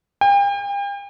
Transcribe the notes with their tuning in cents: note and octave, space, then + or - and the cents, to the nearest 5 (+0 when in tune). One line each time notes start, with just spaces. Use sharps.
G5 +40